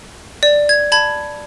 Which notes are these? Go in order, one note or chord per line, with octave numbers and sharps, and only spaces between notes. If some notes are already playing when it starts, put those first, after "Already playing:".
D5
G#6
A5 B5 G#6